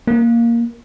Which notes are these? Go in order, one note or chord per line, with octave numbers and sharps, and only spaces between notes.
A#3